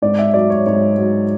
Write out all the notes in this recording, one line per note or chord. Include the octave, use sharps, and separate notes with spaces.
G#2 D5
E5
F#3 D5
C#5
G#2 C#5
F#3